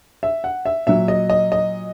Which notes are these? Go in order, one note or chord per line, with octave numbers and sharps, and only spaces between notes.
E5
F#5
E5
A#2 F#3 E5
D#5
D#5
D#5